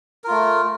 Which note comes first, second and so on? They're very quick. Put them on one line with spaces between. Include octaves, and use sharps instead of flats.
A#4 F4 A3